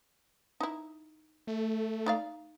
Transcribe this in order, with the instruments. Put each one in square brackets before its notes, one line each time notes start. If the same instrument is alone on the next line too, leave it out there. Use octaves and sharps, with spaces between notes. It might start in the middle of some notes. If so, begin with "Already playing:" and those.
[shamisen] D#4 E4
[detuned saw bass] A3
[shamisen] D#4 D5 F5